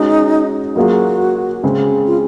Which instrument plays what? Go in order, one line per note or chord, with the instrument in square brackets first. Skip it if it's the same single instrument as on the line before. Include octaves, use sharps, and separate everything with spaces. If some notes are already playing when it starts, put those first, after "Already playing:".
Already playing: [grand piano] G#3 C#4 F#4 [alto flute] D#4
[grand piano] F#3 A#3 F4 G#4 [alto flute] F#4
[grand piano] C#3 G#3 C4
[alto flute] F4